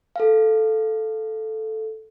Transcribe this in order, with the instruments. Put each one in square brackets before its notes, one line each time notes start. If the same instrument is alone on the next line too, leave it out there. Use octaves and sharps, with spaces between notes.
[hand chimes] A4 F5